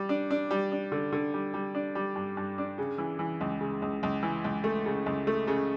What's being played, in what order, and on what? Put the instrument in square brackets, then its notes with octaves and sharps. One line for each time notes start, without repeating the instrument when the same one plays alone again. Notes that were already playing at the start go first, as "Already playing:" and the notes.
Already playing: [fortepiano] G3
D4
D4
G3
D4
D3
D3
G3
G3
D4
G3
G2
G2
D4
C#3
E3
E3
C#2
C#3
C#2
C#2
E3
C#2
A3
C#3
C#2
A3
C#3